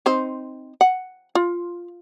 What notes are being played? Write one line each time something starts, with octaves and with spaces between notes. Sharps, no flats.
C4 D#4 C5
F#5
F4